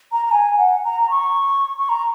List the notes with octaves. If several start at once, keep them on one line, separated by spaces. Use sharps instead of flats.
A#5
A#5
G#5
F#5
A#5
A#5
C#6
C#6
A#5